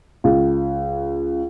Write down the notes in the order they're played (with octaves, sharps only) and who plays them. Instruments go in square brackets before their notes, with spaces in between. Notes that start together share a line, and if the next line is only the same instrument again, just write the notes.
[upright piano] C#2